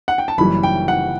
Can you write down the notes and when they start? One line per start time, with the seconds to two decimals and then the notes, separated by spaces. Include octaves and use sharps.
0.08 F#5
0.18 G5
0.28 A5
0.38 F#1 F#2 E3 G3 B5
0.63 G5
0.88 F#5